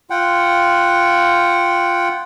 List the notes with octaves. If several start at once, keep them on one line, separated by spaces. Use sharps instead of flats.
F4 F#5 G5